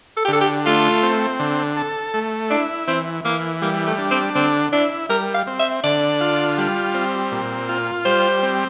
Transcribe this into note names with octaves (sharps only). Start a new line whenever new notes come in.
A4
G4
D3 A4
G4
A3 F4
C4
D3
A4
A3
D4 E4
E3 C4
E3 A#3
G3 A#3
A3
D4
C4
D3 C4
D4 E4
G3 A#4
F5
C4
E5
D3 D5
F4
G3
C4
A#2
F4
G3 C5
C4